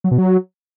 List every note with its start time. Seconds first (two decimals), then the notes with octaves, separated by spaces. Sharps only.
0.04 F#3
0.11 B2
0.18 F#3